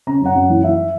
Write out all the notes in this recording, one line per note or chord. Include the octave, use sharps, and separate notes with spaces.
C#3 A#5
F#2 F#5
F#2
E3
E3 E5